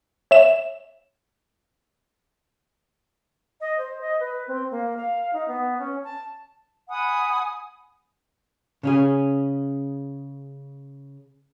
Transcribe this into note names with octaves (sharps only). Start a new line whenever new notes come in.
C#5 E5 E7
D#5
C5
D#5
B4
C4
A#3
F5
D#4
B3
C#4
A5
F#5 G#5 B5 D#6
C#3 C#4 G#4